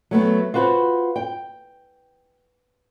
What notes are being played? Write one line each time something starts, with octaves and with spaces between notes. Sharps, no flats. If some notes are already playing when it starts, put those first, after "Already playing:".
F#3 A3 B3
F4 F#4 B4 C5
G5